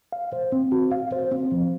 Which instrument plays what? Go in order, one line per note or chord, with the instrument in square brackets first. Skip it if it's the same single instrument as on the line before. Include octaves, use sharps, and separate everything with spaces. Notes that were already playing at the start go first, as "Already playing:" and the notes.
[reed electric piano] F5
C5
C4
F#4
F5
C5
C4
F3